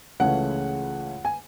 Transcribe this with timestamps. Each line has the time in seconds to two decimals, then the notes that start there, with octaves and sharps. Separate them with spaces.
0.20 C#2 C#3 E3 A3 C#4 F#5
1.25 G#5